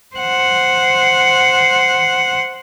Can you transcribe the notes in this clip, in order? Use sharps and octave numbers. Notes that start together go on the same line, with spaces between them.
C5 F#5